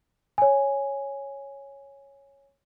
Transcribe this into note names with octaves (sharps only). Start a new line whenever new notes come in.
C#5 G#5